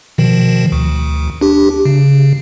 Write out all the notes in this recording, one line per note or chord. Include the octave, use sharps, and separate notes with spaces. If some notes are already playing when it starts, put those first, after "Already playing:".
B2 D#3 F3
D2
D4 G4
C#3